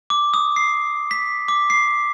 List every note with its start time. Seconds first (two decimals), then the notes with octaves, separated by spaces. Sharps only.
0.10 D6
0.34 D#6
0.56 C7
1.11 B6
1.48 D6
1.70 C7